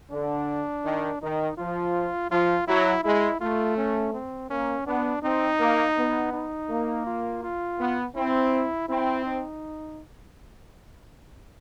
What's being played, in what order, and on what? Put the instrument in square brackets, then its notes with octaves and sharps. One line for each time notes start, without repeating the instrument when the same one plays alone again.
[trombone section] D3 [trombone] D4
[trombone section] D#3
[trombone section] D#3 [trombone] D#4
[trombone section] F3 [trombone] F4
[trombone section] F3 [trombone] F4
[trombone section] F#3 [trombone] E4
[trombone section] G#3 [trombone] E4
[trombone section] A3 [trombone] F4
[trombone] C#4
C4
[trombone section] A#3 [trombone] C#4
[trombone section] B3 [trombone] D4
[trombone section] C4 [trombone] D#4
[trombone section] A#3
B3
[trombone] D#4
[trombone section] A#3
[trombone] F4
F4
[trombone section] B3
[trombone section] C4 [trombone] E4
[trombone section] C4 [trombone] E4
[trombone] D#4